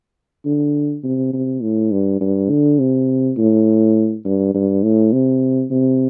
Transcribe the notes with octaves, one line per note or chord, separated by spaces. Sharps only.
D3
C3
C3
A2
G2
G2
D3
C3
A2
G2
G2
A2
C3
C3